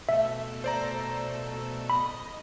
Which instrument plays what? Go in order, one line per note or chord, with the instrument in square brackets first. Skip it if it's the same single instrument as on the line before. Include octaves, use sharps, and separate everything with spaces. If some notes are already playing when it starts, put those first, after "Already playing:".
[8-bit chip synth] B2 A3 A4 [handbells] E5
[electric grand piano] C5 D5 A#5
[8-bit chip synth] D#5 [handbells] B5